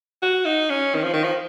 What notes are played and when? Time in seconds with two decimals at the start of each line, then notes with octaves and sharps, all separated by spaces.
0.22 F#4
0.45 D#4
0.70 C#4
0.95 D#3
1.04 F3
1.13 D#3
1.24 F3